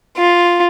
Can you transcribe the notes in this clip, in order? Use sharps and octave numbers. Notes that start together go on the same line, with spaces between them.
F4